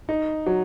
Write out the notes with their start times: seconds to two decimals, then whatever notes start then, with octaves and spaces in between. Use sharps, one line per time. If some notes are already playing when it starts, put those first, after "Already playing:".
0.09 D#4
0.46 F#3